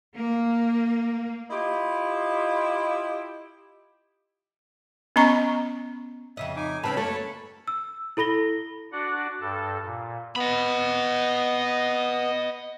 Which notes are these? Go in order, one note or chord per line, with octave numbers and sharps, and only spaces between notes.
A#3
E4 F4 G4 D#5
B3 C#4 D#5 A#5 C#6
F2 C#3 D#5 E5
D#4 G#5 D6
C#3 C4 C#4 B4 A5 B5
F#2 A3 A#3 A4 C#5 A5 B5
E6
E4 A4 B5 A#6 G7
D4 F#4 D5 F#5
G2 A4 A5
A#2
B3 D#5 B5